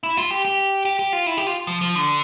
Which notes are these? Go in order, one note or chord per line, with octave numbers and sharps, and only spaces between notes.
E4
F4
G4
G4
G4
G4
F4
E4
G4
F4
F3
F3
D3